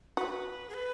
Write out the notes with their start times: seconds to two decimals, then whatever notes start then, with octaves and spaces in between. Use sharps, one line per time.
0.17 F#4 B4
0.70 G#4
0.74 B4